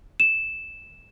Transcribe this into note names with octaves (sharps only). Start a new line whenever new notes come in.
E7